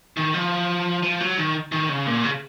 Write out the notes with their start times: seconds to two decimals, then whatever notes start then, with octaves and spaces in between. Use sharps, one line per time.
0.17 D#3
0.34 F3
1.03 F3
1.20 F#3
1.38 D#3
1.72 D#3
1.89 C#3
2.06 A#2
2.24 C#3